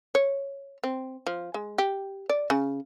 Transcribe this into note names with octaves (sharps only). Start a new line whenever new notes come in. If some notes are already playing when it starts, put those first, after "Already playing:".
C#5
C4
F3
G#3
G4
D5
C#3